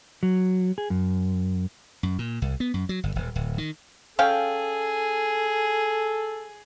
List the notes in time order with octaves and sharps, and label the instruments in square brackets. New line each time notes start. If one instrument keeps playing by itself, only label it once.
[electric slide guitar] F#3
G#4
F#2
[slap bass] F#2
A#2
C2
B3
F#2
F#3
G1
D#1
D1
D#3
[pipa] C#4 F5 G5 [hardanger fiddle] G#4 [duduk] A4